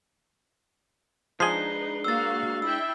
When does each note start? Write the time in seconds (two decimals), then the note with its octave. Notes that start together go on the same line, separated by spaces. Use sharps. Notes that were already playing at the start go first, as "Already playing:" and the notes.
1.40 F3 G#3 D4 D#4 G#4 B4 C7 G7
2.04 A#3 F#4 F5 E6 A6
2.62 E4 E5 G5 E6